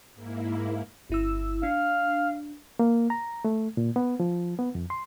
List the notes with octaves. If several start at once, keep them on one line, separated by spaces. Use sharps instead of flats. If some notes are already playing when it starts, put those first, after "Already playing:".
G#2 A#3 E4
G1 E4 E6
D4 F5
A#3
A#5
A3
A#2
B3
F3
B3
F2
C6